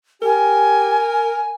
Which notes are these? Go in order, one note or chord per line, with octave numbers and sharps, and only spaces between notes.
G4 A#4 G#5